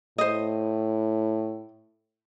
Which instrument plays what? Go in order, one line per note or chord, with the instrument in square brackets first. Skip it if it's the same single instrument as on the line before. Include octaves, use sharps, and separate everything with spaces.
[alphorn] A2 [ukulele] C5 D#5